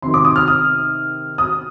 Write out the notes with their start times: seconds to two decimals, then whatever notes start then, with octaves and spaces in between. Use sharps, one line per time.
0.02 C3 D#3 C6
0.14 D6
0.25 D#6
0.36 F6
0.48 D#6
1.38 D#6